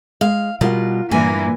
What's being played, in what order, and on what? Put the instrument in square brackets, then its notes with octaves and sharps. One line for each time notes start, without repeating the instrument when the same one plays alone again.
[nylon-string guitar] G#3 [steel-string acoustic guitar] F5
[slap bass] B2 G3 [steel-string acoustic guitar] F4 [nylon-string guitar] A#4 F#5
[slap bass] G2 [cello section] A#2 E3 A#3 [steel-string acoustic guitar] G#5